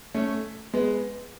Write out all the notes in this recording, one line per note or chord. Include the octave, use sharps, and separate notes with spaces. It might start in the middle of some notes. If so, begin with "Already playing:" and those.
A3 C#4
G#3 B3